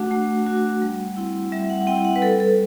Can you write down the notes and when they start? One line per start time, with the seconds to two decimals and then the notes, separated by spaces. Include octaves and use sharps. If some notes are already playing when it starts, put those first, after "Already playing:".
Already playing: A3 D4 F#4 F#5
0.11 A3
0.46 D4 F#4
0.82 G3
1.17 C4 E4
1.52 G3 E5
1.70 F#5
1.87 C4 E4 G5
2.05 F#5
2.16 B4
2.22 G3 A4
2.40 A4